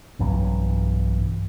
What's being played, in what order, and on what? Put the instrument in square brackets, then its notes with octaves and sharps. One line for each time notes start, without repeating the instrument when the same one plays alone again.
[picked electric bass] B1 G2 E3 F#3